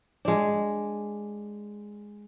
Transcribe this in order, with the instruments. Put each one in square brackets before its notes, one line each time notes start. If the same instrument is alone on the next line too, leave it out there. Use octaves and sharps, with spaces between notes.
[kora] G#3 D4